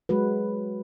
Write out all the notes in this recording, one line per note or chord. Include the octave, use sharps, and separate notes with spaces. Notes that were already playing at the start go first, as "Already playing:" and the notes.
F#3 G#3 F#4 B4